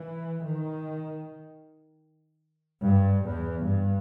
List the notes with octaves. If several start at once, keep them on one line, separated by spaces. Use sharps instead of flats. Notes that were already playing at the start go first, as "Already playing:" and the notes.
Already playing: E3
D#3
G2
E2
G2